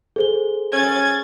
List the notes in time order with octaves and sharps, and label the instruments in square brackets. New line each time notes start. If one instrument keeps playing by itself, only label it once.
[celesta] G#4 C5 G7 [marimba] A4
[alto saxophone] C#4 [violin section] G#6 A6